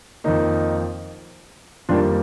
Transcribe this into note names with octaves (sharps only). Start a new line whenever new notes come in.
F2 D#3 A#3 D#4
F2 D#3 G3 A#3 D4 F4